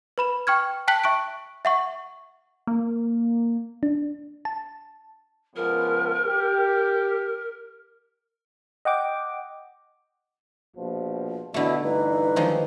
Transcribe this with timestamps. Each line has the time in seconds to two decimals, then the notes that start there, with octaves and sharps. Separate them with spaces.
0.18 B4 B5 E7
0.47 G5 C#6 F6 G#6
0.88 G5 A5 F#6 B6 F#7
1.04 E5 C#6 F#6 D7
1.65 E5 F#5 C#6
2.67 A#3
3.83 D4
4.45 A5
5.56 C#2 F3 B3 A#4
6.25 G4
8.85 D#5 F#5 G5 D6
10.76 A#1 B2 F3
11.54 B2 D3 A3 E4 F#4
11.83 G2 E3 D#4 B4
12.36 D#3 F3 G#3